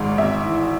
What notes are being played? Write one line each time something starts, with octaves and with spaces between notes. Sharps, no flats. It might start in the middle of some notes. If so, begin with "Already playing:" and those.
Already playing: G#1 G#2
G#1 E5
E3